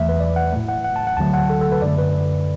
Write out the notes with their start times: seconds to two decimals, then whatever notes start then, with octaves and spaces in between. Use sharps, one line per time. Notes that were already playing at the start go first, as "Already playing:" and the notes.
Already playing: E2 E3 A3 E5
0.09 B4
0.20 D5
0.36 F#5
0.52 A2 A3
0.69 F#5
0.84 F#5
0.96 A5
1.07 F#5
1.17 D2 D3 F#3 A3 A5
1.34 F#5
1.50 A4
1.61 A4
1.72 B4
1.82 F#2 D3 A3 D5
1.98 B4